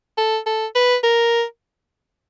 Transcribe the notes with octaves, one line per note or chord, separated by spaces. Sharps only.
A4
A4
B4
A#4